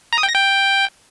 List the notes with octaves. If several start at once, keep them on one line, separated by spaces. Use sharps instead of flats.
A#5
D#6
G5
A#6
G5